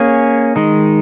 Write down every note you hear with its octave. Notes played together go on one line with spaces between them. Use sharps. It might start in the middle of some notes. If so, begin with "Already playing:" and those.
Already playing: A#3 C#4 G#4 C#5
D#3 G#3 D#4